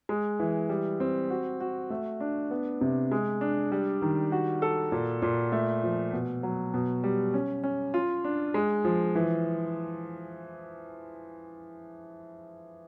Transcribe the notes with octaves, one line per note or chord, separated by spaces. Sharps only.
G#3
E3
G3
C4
F#4
F#4
A3
D4
B3
C3
G#3
D4
G3
D#3
F#4
A4
A#2
A#2
A3
F3
B2
F#3
B2
G3
C#4
C#4
F4
D4
G#3
F3
E3